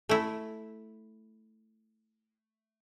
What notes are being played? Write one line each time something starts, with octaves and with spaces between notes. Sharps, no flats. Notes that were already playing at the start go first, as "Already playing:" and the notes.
A3 E4